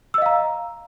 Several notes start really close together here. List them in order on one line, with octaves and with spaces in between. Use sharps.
E6 D#5 F5 A#5